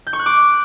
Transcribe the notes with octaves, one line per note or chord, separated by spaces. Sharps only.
G6
C#6
F#6
D6